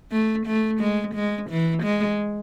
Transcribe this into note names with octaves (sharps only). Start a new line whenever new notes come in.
A3
A3
G#3
G#3
E3
G#3